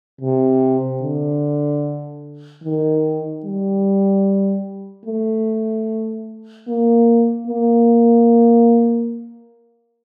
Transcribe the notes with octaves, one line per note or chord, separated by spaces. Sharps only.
C3
D3
D#3
G3
A3
A#3
A#3